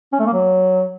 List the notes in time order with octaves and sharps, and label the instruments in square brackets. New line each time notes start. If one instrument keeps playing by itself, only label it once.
[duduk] C#4
A3
A#3
F#3